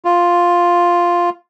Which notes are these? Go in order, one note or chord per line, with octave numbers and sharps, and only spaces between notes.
F4